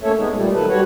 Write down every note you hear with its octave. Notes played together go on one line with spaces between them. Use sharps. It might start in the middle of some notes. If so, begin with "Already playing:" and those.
A3 A#3 C#4 A4 C#5 E5
G#3 B3 D#4
A#2 G3 A3
D#3 F#3 A4 B4
G3 F#4 B4 C#5